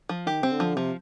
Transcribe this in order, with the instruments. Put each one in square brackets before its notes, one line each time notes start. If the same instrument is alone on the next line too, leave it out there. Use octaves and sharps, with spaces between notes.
[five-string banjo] F3
[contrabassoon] D#3 [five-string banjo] G4
[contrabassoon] C3 [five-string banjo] C4
[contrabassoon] D3
[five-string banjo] F3
[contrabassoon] C3 [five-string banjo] F3